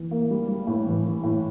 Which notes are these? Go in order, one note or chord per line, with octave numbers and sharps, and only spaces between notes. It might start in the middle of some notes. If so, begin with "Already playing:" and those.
Already playing: E3
A#3
G3
G3
A2
E3
E3
A2